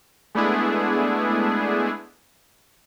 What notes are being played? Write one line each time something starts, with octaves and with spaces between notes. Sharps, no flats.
G#3 A3 B3 D4 E4 G#4